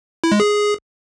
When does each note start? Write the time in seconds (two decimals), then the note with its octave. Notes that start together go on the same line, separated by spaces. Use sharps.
0.24 E4
0.32 G#3
0.40 G#4